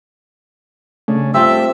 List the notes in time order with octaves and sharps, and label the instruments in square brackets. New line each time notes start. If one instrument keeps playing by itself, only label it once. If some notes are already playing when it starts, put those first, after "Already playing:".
[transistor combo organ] C#3 C#4 D4 [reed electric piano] A3
[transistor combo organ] G3 G4 A4 [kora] C4 F4 [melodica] E5 E6